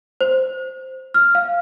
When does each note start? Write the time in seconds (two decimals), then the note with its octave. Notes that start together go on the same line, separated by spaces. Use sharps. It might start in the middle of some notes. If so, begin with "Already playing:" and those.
0.21 C5
1.14 F6
1.35 F5